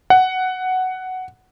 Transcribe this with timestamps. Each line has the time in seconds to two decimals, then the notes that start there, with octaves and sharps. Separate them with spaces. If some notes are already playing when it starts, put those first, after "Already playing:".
0.10 F#5